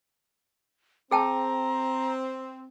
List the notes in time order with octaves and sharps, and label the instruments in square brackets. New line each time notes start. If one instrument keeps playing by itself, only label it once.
[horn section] C4 [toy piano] G#4 G5 A5 [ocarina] A#5